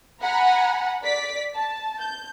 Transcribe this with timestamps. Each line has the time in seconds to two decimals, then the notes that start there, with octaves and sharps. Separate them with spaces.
0.22 F#5 G#5 A#5 B5
1.02 D5 B6
1.54 A5
1.99 G6